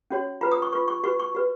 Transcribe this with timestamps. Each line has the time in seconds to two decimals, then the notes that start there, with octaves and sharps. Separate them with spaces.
0.10 C#4 F#4 C#5
0.41 F4 B4 A#5
0.52 D#6
0.62 C#6
0.72 F4 B4 C#6
0.88 C#6
1.04 F#4 B4 C#6
1.20 C#6
1.35 F#4 B4